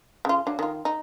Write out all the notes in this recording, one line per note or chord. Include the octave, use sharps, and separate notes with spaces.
C#3 F4
F#3 D4 F5
D#3 F4
D#4